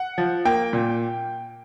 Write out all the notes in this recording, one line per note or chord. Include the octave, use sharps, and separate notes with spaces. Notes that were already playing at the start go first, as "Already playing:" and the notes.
Already playing: F#5
F3
A#3 G5
A#2